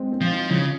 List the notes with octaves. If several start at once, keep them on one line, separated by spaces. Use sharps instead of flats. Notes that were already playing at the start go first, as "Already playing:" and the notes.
Already playing: G#3 C4 G#4
C4
F3
D#4
C#3 F3